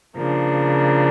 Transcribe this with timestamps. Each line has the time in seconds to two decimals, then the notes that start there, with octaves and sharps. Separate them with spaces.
0.16 C#3 F3 A#3 D4